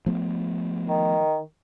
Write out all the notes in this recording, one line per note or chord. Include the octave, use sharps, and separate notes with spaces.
F3 A3 B3
D#3